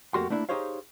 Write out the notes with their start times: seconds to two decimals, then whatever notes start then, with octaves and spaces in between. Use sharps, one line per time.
0.14 F2 A3 A#3 F#4 G4 C6
0.30 A3 A#3 D4 E4
0.49 D#4 G4 G#4 C5 C#5 F5